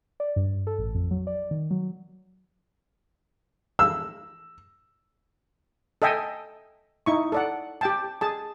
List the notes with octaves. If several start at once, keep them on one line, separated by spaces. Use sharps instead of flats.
D5
G2
A4
A1
F2
F#3
D5
D#3
F#3
E6
A4 D#5 E5 G5 G#5
D#4 E4 C#6
A4 D5 F#5
G4 G5 A5
G#4 A5